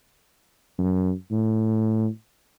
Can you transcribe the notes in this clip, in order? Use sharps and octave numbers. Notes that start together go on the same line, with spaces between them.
F#2
A2